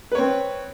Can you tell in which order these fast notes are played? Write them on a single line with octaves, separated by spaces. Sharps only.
B4 C#5 C4